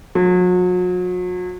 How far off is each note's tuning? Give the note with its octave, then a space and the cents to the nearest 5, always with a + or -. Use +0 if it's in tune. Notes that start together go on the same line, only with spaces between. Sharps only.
F#3 -40